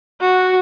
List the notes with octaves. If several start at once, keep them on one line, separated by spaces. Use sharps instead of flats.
F#4